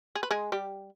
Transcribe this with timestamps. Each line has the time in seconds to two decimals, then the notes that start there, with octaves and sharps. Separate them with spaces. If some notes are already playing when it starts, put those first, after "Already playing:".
0.15 G#4
0.23 B4
0.31 G#3 G#4
0.52 G3 G4